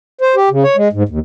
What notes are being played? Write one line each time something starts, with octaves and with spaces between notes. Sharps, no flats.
C5
G4
C#3
C#5
G#3
G#2
D#2